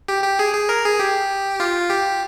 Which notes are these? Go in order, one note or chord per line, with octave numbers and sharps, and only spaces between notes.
G4
G4
G#4
G#4
A#4
G#4
G4
F4
G4